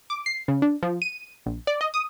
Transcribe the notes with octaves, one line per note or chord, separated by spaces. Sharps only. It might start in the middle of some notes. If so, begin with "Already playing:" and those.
D6
C7
C#3
D4
F3
D#7
A#1
D5
D#5
D#6